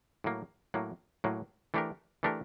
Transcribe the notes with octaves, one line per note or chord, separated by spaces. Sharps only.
A2 F#3 A#3
A2 F#3 A#3
A2 F#3 A#3
E3 A3 D4 G4 A#4
E3 A3 D4 G4 A#4